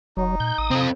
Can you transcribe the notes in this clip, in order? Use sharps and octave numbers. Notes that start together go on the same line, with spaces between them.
F1 F#3 D#4
A#2 G6
A1 D#6
C3 C4 A4